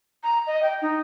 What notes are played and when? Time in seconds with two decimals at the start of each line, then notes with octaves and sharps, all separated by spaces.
0.23 A#5
0.47 D#5
0.63 G5
0.82 D#4